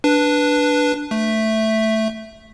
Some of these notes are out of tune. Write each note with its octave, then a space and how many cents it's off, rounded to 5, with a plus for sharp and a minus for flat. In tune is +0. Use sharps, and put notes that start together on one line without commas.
D4 +0 B4 -5
A3 +0 E5 +0